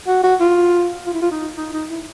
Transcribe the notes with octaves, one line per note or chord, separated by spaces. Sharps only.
F#4
F#4
F4
F4
E4
F4
D#4
D#4
D#4
E4